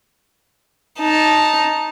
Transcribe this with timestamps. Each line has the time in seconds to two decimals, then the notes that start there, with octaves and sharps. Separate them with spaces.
0.99 D#4 A5